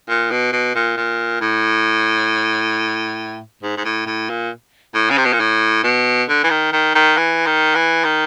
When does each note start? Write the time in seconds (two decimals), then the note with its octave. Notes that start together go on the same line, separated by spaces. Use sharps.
0.09 A#2
0.31 B2
0.52 B2
0.75 A#2
0.97 A#2
1.41 A2
3.63 G#2
3.77 G#2
3.85 A2
4.07 A2
4.30 A#2
4.95 A2
5.10 C#3
5.18 C3
5.25 B2
5.33 A#2
5.40 A2
5.84 B2
6.29 D3
6.44 E3
6.50 D#3
6.72 D#3
6.95 D#3
7.17 E3
7.46 D#3
7.75 E3
8.04 D#3